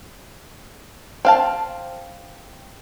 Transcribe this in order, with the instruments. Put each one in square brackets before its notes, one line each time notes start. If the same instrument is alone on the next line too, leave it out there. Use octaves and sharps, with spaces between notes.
[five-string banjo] C4 F5 A5